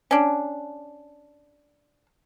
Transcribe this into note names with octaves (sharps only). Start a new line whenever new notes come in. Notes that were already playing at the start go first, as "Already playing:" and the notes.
C#4 D4